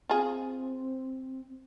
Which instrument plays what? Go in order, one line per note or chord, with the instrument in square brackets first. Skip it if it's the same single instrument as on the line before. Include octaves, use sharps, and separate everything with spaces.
[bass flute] C4 [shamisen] F4 G#4